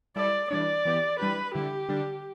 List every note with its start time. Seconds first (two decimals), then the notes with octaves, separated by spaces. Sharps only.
0.16 G3 E4 A4 D5
0.51 E3 G3 D4 D5
0.85 E3 B3 G4
1.19 E3 G3 D4 G4 B4
1.54 D3 G3 E4 G4
1.88 D3 G3 D4